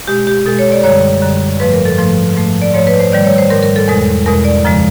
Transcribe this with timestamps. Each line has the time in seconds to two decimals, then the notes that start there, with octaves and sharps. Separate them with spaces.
0.07 B2 G#3 G4
0.27 G4
0.46 B2 G#3 A4
0.59 C#5
0.72 D5
0.83 F#2 D3 G3 C#5
1.22 F#2 D3 G3
1.60 G#2 F3 A3 B4
1.73 A#4
1.85 A4
1.98 G#2 F3 A3
2.36 G#2 F3 A3
2.62 D5
2.74 G#2 F3 A3 C#5
2.87 B4
3.00 C5
3.12 G#2 D#3 G3 D5
3.25 C#5
3.38 C5
3.50 G#2 D#3 G3 A#4
3.63 A#4
3.76 A4
3.88 E2 B2 G#3 A#4
4.26 E2 B2 G#3 A#4
4.45 D5
4.65 F#2 C#3 F3 G#3